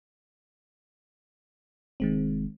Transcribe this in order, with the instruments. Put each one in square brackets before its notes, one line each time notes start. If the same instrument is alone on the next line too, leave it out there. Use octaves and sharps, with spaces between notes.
[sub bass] F1 [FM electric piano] D#3 G#3 C4